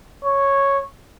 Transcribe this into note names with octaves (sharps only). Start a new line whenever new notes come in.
C#5